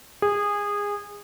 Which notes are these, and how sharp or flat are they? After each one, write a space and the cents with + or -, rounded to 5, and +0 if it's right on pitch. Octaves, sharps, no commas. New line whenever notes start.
G#4 -20